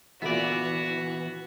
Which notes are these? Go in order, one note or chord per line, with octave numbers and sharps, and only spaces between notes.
A#2 D3 E3 B3 E4 F#4 D5